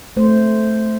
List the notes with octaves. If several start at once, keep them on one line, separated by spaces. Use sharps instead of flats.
A3 C5